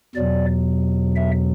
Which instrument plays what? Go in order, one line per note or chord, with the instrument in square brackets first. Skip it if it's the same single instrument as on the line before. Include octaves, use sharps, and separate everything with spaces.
[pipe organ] E2 B2 F#3 D5
E5